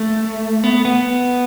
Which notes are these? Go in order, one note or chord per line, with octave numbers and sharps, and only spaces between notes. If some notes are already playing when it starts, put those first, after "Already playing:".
Already playing: A3
B3
B3